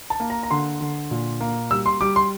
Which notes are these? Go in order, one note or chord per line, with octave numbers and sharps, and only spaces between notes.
A5
A#3
A#5
A#5
D3 C6
D3
A#2
A#3
G3 E6
C6
G3 D6
C6